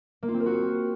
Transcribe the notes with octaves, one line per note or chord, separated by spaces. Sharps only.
A#3
F4
C4
A#4
F#4